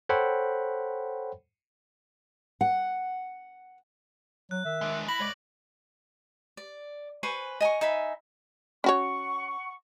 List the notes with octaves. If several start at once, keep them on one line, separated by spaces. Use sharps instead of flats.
A4 C5 C#5 F#5 G5 B5
F#5
F#3 F#6
D#3 E5
G#3 D4
E4 B5 A#6 F#7
G#3 C#5 D5
D5
B4 C5 G#5 C#6
D#5 G#5 A#5 C#6
D#4 E5 G#5 B5
C#4 F#4 C#5 F#5 C#6